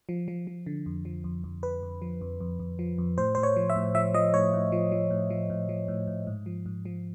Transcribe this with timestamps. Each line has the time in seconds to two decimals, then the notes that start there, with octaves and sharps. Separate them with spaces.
0.09 F3
0.28 F3
0.47 F3
0.66 D3
0.86 F2
1.05 F3
1.24 F2
1.44 F2
1.63 F2 B4
1.83 F2
2.02 F3
2.21 F2
2.40 F2
2.59 F2
2.79 F3
2.98 F2
3.18 A2 C5
3.35 A2 C5
3.43 C#5
3.56 F3
3.70 E5
3.76 A2
3.95 F3 E5
4.14 F3 D#5
4.34 A2 C#5
4.53 A2
4.72 F3
4.92 F3
5.10 A2
5.30 F3
5.50 A2
5.69 F3
5.88 A2
6.07 A2
6.27 G#2
6.46 F3
6.66 G#2
6.85 F3